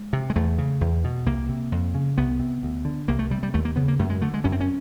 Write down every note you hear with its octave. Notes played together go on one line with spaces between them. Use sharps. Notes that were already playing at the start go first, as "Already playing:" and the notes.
Already playing: G#3
C3
G#3
E2 A3
C#3
E2
B2
C2 A#3
C3
F2
C#3
C2 B3
C3
D2
D3
C2 A#3
A3
C3 G3
G3
D#2 A3
A#3
C#3 B3
A#3
F#2 A3
G#3
D3 A3
G#3
F#2 C#4
C4
C#4